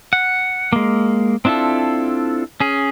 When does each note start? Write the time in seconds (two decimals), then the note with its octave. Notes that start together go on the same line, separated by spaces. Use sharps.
0.13 F#5
0.73 G#3 A#3
1.45 C4 D4 E4 F4 A4
2.60 C#4 G#4